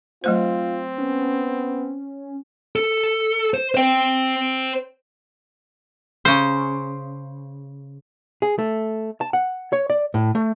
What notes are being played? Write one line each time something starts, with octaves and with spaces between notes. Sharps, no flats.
F#3 A3 C4 F4 C5
B3 C#4
A4
C5
C5 G5
C#3 C5
G#4
A3
A5
F#5
C#5
D5
A2
A3